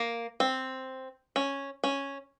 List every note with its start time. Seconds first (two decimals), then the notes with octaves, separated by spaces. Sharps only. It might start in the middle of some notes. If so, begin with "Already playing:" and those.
Already playing: A#3
0.40 C4
1.36 C#4
1.84 C#4